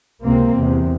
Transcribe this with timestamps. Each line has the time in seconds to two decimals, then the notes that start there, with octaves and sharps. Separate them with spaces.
0.24 C#2 C3 A#3 C4
0.56 E2 C3